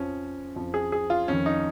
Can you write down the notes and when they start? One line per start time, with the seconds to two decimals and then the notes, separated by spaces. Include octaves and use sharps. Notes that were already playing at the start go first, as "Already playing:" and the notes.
Already playing: F2 F3 C#4
0.56 F2 F3
0.74 G#4
0.92 G#4
1.10 F4
1.28 F2 D#3 C#4
1.46 D#4